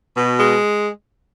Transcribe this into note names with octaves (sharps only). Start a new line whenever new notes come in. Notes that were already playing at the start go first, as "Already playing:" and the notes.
B2
G#3